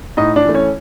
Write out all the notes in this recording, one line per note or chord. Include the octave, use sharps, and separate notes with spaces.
A2 D#4 D#5
D4 D5
E3 A3
C#4 C#5